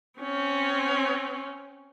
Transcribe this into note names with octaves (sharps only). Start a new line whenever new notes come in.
C4 C#4